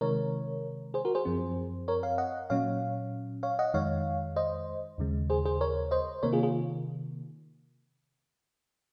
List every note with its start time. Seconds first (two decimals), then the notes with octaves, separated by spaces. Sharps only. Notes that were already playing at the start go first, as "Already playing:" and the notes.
0.01 C3 D#3 G#3 A#4 C#5
0.94 G#4 C5
1.05 F#4 A#4
1.15 G#4 C5
1.25 F#2 F3 C4
1.88 A#4 C#5
2.03 C#5 F5
2.18 D#5 F#5
2.50 A#2 F#3 C#4 C#5 F5
3.43 C#5 F5
3.59 D#5 F#5
3.74 F2 D#3 G#3 C#5 F5
4.36 C5 D#5
4.98 D#2 C#3 G#3
5.30 G#4 C5
5.45 G#4 C5
5.61 A#4 C#5
5.91 C5 D#5
6.23 C3 D#3 A#3 A#4 C#5
6.33 F4 G#4
6.43 F4 G#4